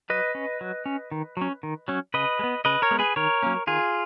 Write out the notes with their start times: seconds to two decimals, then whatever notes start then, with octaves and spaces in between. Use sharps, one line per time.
0.10 F#3 B4 D#5
0.35 C#4
0.61 F#3
0.86 C#4
1.11 D#3
1.37 F#3 C#4
1.63 D#3
1.88 F#3 C#4
2.14 C#3 B4 D#5
2.39 G#3
2.44 B3
2.65 C#3 B4 D#5
2.82 A#4 C#5
2.91 G#3 B3
2.99 G#4 B4
3.16 D#3 A#4 C#5
3.42 F#3 A#3 C#4
3.67 D#3 F4 G#4